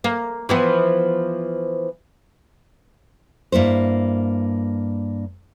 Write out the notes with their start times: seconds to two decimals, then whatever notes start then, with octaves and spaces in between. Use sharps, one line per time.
0.04 A#3
0.49 E3 F3 B3
3.52 G2 A#3 E4 C5